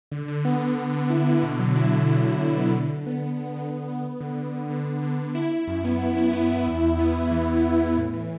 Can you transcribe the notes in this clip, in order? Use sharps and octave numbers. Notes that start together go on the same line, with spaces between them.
D3
D3
B3
D3
B3
D3
E4
D3
B2
F#3
E4
F#3
F#3
B2
B2
B3
D3
D3
B3
D3
D3
D3
D3
B3
B3
D3
D3
D3
D3
D3
D3
D3
E4
E4
F#2
B3
E4
E4
B3
E4
E2
E2
B3
E2
E3
E2
E2
E3
A2
E3